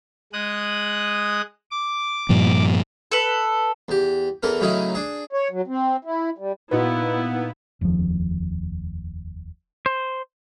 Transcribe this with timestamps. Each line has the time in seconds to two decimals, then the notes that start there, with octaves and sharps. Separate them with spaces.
0.33 G#3 D#6 F#6
1.71 D6
2.29 G2 A#2 F3
3.12 A4 B4
3.88 E2 G4
4.43 E2 E3 A4 A#4
4.60 A2 C#3 F#3 C#4 D#4 E4
4.95 D4 G#4
5.33 C#5
5.51 F#3
5.67 C4
6.05 E4
6.38 G3
6.71 A#2 B3 D#4 E4 F#4 B4
7.81 F1 D#2 A2 F3
9.86 C5